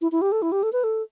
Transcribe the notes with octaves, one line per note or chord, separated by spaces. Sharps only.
E4
E4
G4
A4
E4
G4
A4
B4
A4